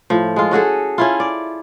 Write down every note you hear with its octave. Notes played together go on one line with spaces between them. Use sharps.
A2 F3
G#3 F4
C#4 F#4 G#4 A4
C#4 E4 F4
D5